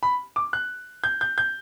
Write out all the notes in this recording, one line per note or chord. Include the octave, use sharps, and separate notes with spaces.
B5
D6
F#6
G6
G6
G6